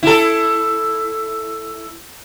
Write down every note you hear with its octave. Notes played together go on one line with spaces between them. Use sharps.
E4 A4